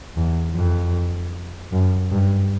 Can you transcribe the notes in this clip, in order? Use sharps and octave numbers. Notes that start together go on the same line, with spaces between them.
E2
F2
F#2
G2